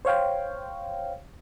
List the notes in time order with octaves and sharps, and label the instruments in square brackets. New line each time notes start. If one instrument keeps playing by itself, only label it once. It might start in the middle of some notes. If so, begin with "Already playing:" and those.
[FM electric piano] C5 C#5 F5 G5